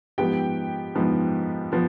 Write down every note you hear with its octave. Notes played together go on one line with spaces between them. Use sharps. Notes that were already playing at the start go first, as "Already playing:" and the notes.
G#2 F3 B3 G4 G5
G#2 F3 B3
F3 B3